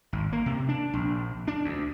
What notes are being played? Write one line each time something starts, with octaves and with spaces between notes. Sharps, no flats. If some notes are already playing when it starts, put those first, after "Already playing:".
G#1
A#3
C3
D4
A#1
D4
D2